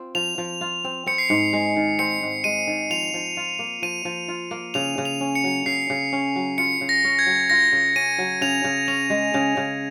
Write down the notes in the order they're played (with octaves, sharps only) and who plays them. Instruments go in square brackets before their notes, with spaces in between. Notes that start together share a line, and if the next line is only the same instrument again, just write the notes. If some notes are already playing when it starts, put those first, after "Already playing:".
Already playing: [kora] C4 F4
[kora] F3 [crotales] F7
[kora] F3
F4
C4
[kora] C4 [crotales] C#7
[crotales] C7
[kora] G#2 [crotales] C#7
[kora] G#3
D#3
[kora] C4 [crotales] C#7
[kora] G#2
[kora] G#3 [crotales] D#7
[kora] D#3
[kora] F3 [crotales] F7
[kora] F3
F4
A#3
[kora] F3 [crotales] D#7
[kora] F3
F4
A#3
[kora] C#3 [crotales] F7
[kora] C#3
[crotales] F7
[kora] C#4
[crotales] C#7
[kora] F#3
[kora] C#3 [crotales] C7
[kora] C#3
C#4
F#3
[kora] F4 [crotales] C#7
[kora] C#3
[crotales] A#6
[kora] C#4
[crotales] G#6
[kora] F#3
[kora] F4 [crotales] A#6
[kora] C#3
[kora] C#4 [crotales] D#7
[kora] F#3
[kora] C#3 [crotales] F7
[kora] C#3
[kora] C#4 [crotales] F7
[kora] G#3
C#3
C#3